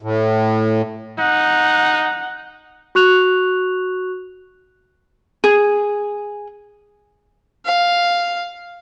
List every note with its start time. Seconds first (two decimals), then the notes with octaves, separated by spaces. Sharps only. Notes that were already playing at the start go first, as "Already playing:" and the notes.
0.02 A2
1.19 D#4 F#5
2.95 F#4 C#6 F#6 F7
5.44 G#4
7.66 F5